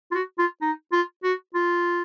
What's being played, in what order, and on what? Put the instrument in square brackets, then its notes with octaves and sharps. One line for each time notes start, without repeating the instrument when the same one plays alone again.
[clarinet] F4
F#4
F4
D#4
F4
F#4
F4